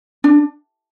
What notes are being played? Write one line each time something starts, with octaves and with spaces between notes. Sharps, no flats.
D4